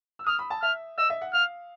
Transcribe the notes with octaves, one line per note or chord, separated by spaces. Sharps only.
E6
D#6 F6
B5
A5
E5 F6
D#5 E6
E5
F#5
F5 F6